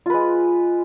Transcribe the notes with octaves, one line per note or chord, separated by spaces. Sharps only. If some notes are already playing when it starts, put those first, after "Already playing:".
G#3 F4 B4